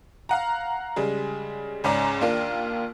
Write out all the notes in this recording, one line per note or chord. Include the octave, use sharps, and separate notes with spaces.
F5 F#5 A#5
C#3 G3 G#3
C#2 G#2 C#4 D5 A#5
D#2 D4 F4 A#4